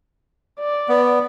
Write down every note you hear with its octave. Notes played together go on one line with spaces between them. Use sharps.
D5
B3